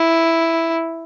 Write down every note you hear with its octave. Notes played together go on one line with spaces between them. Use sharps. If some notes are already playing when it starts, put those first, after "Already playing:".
Already playing: E4